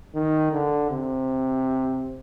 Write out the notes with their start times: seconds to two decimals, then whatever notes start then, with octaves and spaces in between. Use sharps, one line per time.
0.15 D#3
0.52 D3
0.91 C3